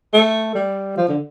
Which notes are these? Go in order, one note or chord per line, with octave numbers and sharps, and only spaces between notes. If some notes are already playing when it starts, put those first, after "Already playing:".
A3
G3
F3
D3